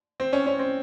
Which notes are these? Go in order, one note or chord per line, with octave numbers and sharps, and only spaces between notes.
C4
C#4
C#4
C4